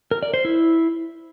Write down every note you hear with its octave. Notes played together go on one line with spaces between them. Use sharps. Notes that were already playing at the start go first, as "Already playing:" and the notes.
A#4
D5
C5
E4